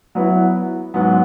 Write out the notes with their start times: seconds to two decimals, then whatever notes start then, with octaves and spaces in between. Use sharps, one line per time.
0.15 F#3 B3 E4 B4
0.94 G#2 F#3 B3